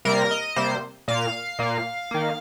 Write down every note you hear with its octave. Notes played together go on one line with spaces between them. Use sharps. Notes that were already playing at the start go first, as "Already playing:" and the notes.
C3 G3 A#3 A#4
D#5
C3 G3 A#3 C5
A#2 A#3 F5
A#2 A#3
D#3 A#3